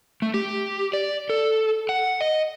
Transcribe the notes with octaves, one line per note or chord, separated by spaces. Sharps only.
A3
G4
D5
A4
F#5
D#5